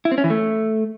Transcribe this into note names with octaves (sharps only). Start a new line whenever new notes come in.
E4
C4
C#4
E3
A3